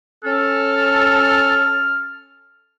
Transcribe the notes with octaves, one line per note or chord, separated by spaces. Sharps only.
C#4 A4 F6